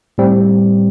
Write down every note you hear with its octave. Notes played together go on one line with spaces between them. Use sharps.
A2 G3 C4